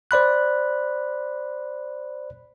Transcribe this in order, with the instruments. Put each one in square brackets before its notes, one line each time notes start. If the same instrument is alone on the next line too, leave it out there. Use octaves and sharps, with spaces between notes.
[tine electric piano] C5 D5 B5 F#6